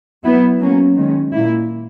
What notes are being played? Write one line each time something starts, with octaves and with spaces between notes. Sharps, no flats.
F#3 B3 E4
F#3 A#3 C#4
D#3 G#3 C#4
A#2 A#3 E4